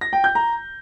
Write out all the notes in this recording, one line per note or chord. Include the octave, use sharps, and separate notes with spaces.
A#6
G5
G6
A#5